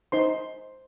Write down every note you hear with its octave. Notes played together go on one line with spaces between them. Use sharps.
D#4 C5 C6